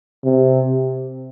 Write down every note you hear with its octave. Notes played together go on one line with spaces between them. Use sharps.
C3